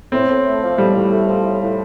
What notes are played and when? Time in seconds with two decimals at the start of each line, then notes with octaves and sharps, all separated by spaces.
0.12 A2 C4
0.28 A2
0.45 A3
0.62 F3
0.78 A2 G3
0.95 A2
1.11 A3
1.28 F3
1.44 A2
1.62 A2